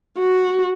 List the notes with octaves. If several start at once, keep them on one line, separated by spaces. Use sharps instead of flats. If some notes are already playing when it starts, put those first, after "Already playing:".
F#4